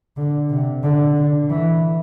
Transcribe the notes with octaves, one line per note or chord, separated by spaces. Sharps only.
D3
C3
D3
D3
E3